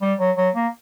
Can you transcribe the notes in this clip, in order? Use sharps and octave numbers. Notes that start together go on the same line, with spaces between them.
G3
F#3
F#3
A#3